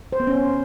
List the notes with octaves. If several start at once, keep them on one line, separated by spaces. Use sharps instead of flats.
C5
B3
C#4